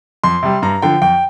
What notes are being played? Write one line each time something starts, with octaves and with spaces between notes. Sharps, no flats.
F2 C6
C3 G3
G2 A#5
D3 F3 G5
F2 G5